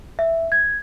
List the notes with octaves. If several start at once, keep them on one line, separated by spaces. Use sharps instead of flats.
E5
G#6